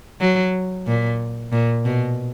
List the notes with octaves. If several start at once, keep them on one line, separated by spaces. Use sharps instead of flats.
F#3
A#2
A#2
B2